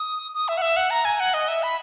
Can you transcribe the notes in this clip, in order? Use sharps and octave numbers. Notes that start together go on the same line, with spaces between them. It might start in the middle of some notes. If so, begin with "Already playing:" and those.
Already playing: D#6
D#6
E5
F#5
E5
F#5
A#5
G#5
F#5
D#5
E5
B5